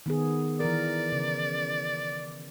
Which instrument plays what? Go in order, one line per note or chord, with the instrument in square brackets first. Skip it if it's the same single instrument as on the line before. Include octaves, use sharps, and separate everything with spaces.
[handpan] D#3 B3 G#4
[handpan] E3 A#4 [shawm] D5
[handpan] C#3